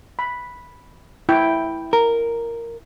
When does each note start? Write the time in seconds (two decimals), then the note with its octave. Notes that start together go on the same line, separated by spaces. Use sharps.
0.19 B5
1.29 E4 G5
1.93 A#4